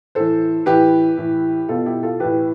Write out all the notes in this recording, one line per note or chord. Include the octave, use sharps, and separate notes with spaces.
A2 E3 A4 C5
A2 E3 G4 B4
A2 E3
B2 F4 A4
E4 G4
F4 A4
A2 E3 G4 B4